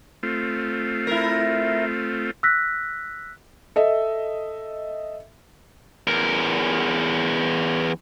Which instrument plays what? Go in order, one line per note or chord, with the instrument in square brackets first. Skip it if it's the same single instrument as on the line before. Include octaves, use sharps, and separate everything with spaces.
[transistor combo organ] A3 C4 F4
[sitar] E4 A#4
[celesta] E6 F#6 A#6 B6
[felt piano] A4 D#5 E5
[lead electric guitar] E2 A#4